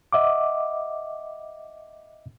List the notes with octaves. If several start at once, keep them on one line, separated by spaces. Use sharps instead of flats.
D#5 E5 F#5 D6